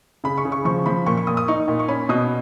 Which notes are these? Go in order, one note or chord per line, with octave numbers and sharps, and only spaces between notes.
C#3 B5
C#6
C#3
C#6
F3 C#6
F3 B5
A#2 C#6
C#6
A#2 D#6
D#6
D#4 C#6
A#2
C#6
C#4 B5
B2 D#6